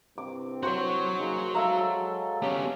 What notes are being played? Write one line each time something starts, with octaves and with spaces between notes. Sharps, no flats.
C2 G2 C4 D6
F#4 C5 C#5 C#6
C#3 A#3 D#4
F#3 G#3 A4 E5 F5 A#5
B3 C#4 G4